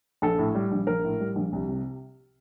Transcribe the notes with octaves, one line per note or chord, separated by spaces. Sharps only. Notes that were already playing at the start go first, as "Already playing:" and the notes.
A#1 A4
A2
G3
A#1
A#1 A#4
A2
G3
A#1
C2
C3